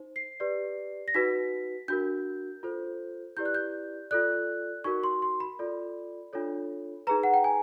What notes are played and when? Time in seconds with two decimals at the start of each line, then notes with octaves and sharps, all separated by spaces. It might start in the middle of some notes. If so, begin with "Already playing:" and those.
Already playing: D#4 C5
0.16 C7
0.40 G4 B4 D5
1.08 A#6
1.14 D#4 F#4 B4 B6
1.88 D4 F#4 A#4 G6
2.63 F4 A4 C5
3.37 E4 G4 B4 D5 G6
3.46 F#6
3.55 G6
4.11 F4 A4 D5 F#6
4.84 D#4 F#4 A#4 C#6
5.04 C6
5.22 C6
5.40 B5
5.59 F4 A4 D5
6.33 D4 F4 A4 C#5
7.07 D#4 G#4 B4 A#5
7.23 F#5
7.34 G5
7.44 G#5